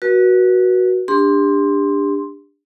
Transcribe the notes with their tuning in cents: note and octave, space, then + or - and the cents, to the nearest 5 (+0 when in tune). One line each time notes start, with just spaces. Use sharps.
F#4 +0 B4 -40
D4 +0 G4 +30 C6 +0